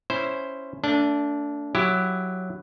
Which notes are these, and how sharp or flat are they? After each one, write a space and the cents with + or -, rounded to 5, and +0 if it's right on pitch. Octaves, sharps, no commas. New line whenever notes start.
C#4 +0 E4 +0 C5 +0
A3 +30 D4 -20
F#3 +0 E4 +15 G4 +0